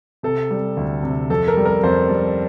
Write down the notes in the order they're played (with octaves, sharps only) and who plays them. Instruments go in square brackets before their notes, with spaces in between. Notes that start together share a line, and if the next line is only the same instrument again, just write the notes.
[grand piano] C3 A4
G3
D2
C3
F2 A4
A#4
G3
A#4
F2 C5
G3